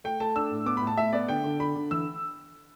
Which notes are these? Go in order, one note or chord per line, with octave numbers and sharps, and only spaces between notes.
A3 G5
A3 A5
D4 E6
A2
B3 D6
A2 B5
A5
A2 E5
B3 D5
D3 G5
D3
D3 B5
D3
E3 E6